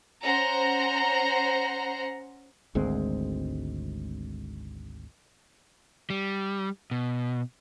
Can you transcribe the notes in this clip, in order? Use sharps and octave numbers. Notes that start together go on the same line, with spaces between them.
C#4 C5 F#5 A#5
G#1 D2 G#3 C4
G3
B2